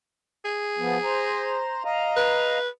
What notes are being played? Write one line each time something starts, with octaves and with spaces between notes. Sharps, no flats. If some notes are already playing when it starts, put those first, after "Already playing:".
G#4
F3 B3
C5 A#5
D#5 F5 A#5
B4